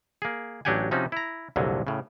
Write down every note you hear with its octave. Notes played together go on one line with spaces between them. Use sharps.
A#3 G#4
A1 F#3 D4 G4 F#5 G#5
C3 F3 C#4 D#4 F#4
E4 A#5
C2 F2 A#2 D3 F#3
A2 C#3